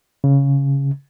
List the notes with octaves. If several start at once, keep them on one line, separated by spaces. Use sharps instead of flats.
C#3